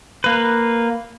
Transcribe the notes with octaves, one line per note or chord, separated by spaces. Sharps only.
A#3 B4